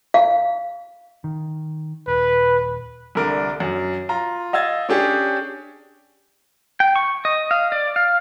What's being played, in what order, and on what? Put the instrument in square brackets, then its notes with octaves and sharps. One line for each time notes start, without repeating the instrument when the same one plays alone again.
[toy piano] F5
[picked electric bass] D#3
[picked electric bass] D#1 [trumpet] B4
[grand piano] C2 D3 A#4 D5
F#2
F4 A#5
D#5 F5 E6 G#6 A6
C#4 D4 G4 G#4 C#5
[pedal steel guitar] G5
C#6
D#5
F5
D5
F5